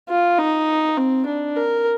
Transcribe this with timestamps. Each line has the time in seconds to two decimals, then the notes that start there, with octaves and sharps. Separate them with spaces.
0.09 F4
0.38 D#4
0.97 C4
1.26 D4
1.56 A#4